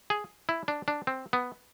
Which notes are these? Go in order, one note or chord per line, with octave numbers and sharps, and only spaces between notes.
G#4
E4
D4
D4
C4
B3